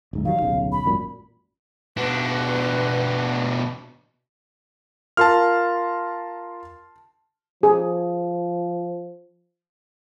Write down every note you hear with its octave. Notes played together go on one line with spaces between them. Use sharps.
D1 G#2
D#3 F#3 G3 F5
D1 B1 C#3
B5
G#1 F#2 A#2
B2 D4 B4
F4 A#4 A5 C6 F6
F3 G#4